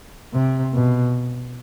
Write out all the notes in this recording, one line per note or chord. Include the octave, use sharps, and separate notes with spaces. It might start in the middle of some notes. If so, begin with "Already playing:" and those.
C3
B2